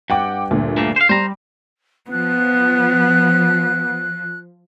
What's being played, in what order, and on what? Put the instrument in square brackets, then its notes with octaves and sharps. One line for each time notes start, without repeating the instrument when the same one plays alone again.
[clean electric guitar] G2 [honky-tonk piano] F#5 G5 D6
[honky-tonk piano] D2 A#2
[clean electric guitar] G2 A3 A#3
C5 F5
[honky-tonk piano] G3 [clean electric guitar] C5 A#5
[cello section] F3 [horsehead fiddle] B3 [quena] F#6